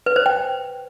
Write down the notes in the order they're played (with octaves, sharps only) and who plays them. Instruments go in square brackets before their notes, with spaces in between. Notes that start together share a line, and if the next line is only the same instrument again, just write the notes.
[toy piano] B4
C5
G5